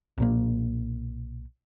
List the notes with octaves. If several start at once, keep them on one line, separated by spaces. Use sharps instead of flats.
B1 A#2 A#3